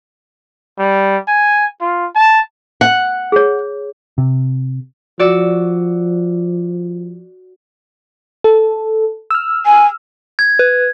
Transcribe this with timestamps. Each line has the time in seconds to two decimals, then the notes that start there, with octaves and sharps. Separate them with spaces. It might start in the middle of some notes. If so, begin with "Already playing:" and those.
0.79 G3
1.28 G#5
1.81 F4
2.15 A5
2.81 F#5
3.32 G#4 C#5
4.18 C3
5.19 F3 F#4 D5 E6
8.44 A4
9.30 E6 F6
9.66 G#5
10.39 G#6
10.59 B4